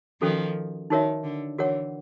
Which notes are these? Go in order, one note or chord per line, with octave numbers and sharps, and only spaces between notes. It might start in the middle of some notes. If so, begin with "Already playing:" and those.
D#3 F3 C#4 F#4 A4
D#3 D#4 F#4 A#4 C#5 E5
D3
D3 E3 F#4 A#4 C#5 F#5